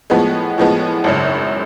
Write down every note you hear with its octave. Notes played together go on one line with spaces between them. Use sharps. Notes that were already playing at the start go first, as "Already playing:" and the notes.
A2 F3 G#3 B3
A2 F3 G#3 B3
G#1 F#2 C#3